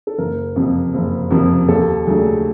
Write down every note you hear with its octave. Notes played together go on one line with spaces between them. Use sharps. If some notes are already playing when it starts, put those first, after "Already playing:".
A4
F#1 A#4
F2 C3 F3 A#3
F#1
F2 C3 F3 A#3
D#2 A4
C#3 F#3 A3 D4 G#4